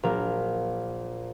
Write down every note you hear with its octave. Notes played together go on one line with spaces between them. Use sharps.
A#1 F#3 A#4 F5